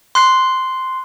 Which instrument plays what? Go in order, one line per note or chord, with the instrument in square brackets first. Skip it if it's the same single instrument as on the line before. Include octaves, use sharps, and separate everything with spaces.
[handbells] C6 F#6 C7